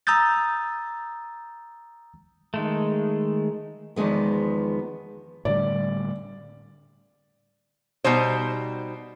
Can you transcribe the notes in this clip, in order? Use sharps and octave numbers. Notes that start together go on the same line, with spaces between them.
A#5 D#6 E6 G6 A6
D#3 G#3 A3
E2 D#3 F3 G#3 B3
A2 D3 G3 D5
B2 G3 D#4 C5